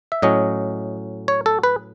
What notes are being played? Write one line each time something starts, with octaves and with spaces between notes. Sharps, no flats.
E5
A2 F#3 C#4 D#5
C#5
A4
B4